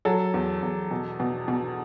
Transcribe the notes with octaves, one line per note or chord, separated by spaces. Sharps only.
F#3 A4
E2
E2
B2
B2
B2